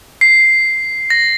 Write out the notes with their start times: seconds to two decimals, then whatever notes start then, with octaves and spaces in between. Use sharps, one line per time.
0.21 C7
1.10 A#6